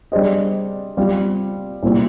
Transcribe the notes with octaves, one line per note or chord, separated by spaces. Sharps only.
G3 D4 G#4 C5 D#5
G3 C4 F4
C2 A#2 G3 C4